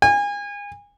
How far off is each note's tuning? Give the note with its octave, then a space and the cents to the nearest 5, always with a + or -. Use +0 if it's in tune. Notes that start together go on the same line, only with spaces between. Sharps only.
G#5 -30